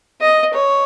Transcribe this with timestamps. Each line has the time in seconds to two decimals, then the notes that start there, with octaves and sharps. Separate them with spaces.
0.21 D#5
0.54 C#5